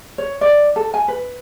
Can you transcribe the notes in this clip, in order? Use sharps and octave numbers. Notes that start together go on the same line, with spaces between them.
C#5
D5
A4
G#5
B4